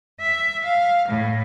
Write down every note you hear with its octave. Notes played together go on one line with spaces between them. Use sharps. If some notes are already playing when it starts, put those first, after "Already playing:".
E5
F5
A2